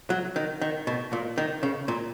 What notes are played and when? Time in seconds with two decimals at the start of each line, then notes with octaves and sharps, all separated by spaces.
0.10 F#3
0.36 D#3
0.61 D#3
0.87 B2
1.13 A#2
1.38 D#3
1.63 C#3
1.88 A#2